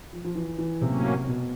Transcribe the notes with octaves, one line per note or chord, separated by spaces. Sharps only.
F3
F3
E3
E3
A2 C3 F#3 A#3 C#4
B2